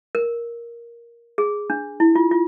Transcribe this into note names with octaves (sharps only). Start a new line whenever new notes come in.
A#4
G#4
D4
E4
F4
F4